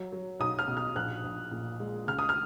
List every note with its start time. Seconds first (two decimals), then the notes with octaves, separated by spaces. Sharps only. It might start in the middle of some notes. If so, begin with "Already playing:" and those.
Already playing: F#3
0.12 F#3
0.40 B1 D#6
0.59 F6
0.68 B2
0.77 F6
0.96 A#1 F#6
1.24 A#1
1.51 A#2
1.80 G#3
2.07 C#2 F6
2.19 D#6
2.29 F6